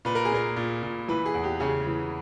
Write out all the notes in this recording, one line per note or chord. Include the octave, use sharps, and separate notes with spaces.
A#2 B4
A#4
G#4
A#2 A#4
A#2
A#2
E3 B4
G#4
E2
G4
C#3 G#4
E3